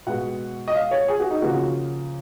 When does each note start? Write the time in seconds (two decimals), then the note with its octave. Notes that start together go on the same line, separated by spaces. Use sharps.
0.07 B2 G#3 F#5
0.68 D#5
0.75 F5
0.91 C#5
1.08 G#4
1.20 F#4
1.30 D#4
1.42 C#3 F3 A#3 F#4